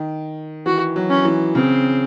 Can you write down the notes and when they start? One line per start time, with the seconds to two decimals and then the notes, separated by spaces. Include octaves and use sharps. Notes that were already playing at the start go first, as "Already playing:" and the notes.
Already playing: D#3
0.66 E3 F#4
0.96 F#3
1.10 C#4
1.25 E3
1.55 C#3 C4